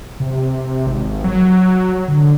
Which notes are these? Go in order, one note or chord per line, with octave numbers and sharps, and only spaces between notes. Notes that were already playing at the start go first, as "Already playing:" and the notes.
C3
G#1
F#3
D3